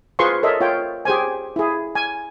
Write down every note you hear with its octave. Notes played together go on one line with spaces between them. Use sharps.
F4 G#4 B4 C5 C6 C#6
A4 A#4 C#5 D#5 E5
F4 C#5 G5
G4 G#4 C5 G#5
E4 G#4
G#5